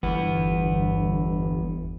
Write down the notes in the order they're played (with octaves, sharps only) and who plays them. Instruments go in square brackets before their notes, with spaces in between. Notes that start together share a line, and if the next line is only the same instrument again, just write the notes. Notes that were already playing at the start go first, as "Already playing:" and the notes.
[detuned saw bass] G1 [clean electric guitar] E2 B3